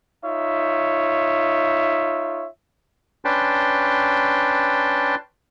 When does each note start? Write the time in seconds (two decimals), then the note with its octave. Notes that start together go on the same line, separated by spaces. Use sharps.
0.24 D#4 F4 C#5 E5
3.25 C#4 D4 B4 G5 A5 C6